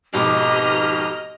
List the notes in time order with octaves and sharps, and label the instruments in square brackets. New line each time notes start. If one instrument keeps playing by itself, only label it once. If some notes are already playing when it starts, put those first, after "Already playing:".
[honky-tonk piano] F2 G#2 B2 [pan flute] G4 [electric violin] D#5 F6